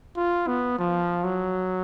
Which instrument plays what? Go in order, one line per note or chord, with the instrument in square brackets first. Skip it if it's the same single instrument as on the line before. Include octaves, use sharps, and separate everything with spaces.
[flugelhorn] F4
B3
F3
F#3